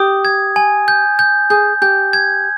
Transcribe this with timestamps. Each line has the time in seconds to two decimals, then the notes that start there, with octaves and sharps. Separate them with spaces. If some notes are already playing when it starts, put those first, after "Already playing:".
Already playing: G4 D#6
0.25 G#6
0.56 G#5
0.88 G6
1.19 G6
1.50 G#4 G6
1.82 G4 G6
2.13 G#6